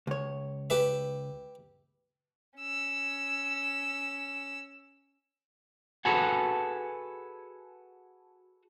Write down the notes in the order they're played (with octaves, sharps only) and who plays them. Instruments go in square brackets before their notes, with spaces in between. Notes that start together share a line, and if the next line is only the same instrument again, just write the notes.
[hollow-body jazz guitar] C#2 C#5
[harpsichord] G4 B4 E5
[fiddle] C#4 E6
[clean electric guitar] F#4 G#4 A4 B4 F#5 G#5